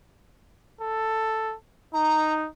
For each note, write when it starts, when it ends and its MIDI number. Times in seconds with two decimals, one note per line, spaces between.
0.81 1.55 69
1.94 2.47 63
1.94 2.33 82